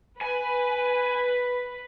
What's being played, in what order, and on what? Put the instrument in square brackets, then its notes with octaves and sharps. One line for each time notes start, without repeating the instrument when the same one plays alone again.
[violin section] B4 [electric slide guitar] G#5